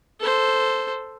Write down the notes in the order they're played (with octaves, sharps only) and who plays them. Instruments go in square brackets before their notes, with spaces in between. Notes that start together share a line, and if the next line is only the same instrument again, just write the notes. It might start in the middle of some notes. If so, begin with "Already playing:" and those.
[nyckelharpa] A4 C5